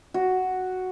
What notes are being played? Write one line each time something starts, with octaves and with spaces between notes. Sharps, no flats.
F#4